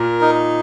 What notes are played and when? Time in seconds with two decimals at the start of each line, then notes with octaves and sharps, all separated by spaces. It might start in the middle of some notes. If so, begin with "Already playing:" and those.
Already playing: A#2 A#4
0.21 D#4